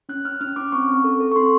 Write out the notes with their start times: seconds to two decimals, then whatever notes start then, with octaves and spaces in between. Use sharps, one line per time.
0.09 C#4 F#6
0.25 C#4 F6
0.41 C#4 F6
0.56 C#4 D6
0.72 C4 C#6
0.89 C4
1.04 A4
1.20 A4
1.31 C#6
1.36 C4 C6